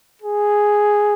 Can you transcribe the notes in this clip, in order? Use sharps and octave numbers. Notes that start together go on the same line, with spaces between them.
G#4